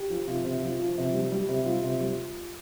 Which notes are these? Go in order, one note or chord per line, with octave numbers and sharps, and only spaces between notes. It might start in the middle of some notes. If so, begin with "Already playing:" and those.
Already playing: G4
F3
C3 F4
C3
F3
F3
C3
G3
G3
C3
G3 F4
C3
G3